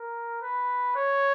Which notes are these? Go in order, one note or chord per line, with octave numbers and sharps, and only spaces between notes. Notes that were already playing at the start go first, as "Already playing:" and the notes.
Already playing: A#4
B4
C#5